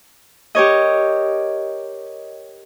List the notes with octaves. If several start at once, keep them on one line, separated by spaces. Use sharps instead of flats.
G4 A#4 C#5 D#5